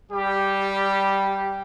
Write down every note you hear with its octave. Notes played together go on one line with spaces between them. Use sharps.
G3 G4